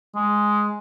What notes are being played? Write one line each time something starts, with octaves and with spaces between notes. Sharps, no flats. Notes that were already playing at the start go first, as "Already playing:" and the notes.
G#3